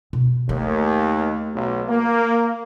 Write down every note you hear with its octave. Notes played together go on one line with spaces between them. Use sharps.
B2
D#2 A3
B1
A#3